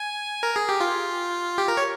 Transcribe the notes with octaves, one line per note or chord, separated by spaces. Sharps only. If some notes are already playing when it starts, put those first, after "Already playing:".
Already playing: G#5
A#4
G#4
G4
F4
G4
A#4
C#5